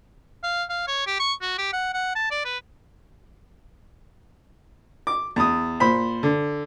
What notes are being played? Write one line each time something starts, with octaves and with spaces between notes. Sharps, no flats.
F5
F5
C#5
G4
C#6
F#4
G4
F#5
F#5
A5
D5
B4
D6
E2 D#6
A#2 C5 B5
D3